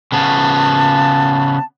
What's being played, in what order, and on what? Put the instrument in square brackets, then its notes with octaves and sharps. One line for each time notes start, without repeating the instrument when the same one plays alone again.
[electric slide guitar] C#3 B3 [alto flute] A5